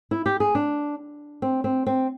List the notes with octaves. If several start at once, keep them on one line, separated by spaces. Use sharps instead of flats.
E4
G4
G#4
D4
C4
C4
C4